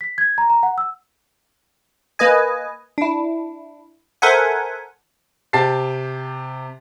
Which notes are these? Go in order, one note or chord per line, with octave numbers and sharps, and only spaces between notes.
B6
G#6
A#5
A#5
F#5
E6
A#3 B4 D#5 G#5
D4 E4
A4 A#4 C5 E5 F#5 G#5
C3 G4 A5 A6 C7